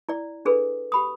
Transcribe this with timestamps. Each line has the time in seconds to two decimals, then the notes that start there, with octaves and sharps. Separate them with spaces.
0.09 E4 D5
0.45 D4 G#4 A4 B4
0.92 G4 B5 D#6